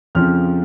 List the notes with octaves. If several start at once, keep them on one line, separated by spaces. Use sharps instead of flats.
F2 C#3 F3 F6